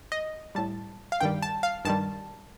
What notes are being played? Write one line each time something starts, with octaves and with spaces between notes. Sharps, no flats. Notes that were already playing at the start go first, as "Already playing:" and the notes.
D#5
A2 G3 A5
F5
G2 D#3 G3 G5
A5
F5
G2 D#3 G3 A5